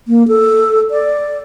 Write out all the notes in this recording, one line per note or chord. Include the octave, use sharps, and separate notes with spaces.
A#3
A4
D5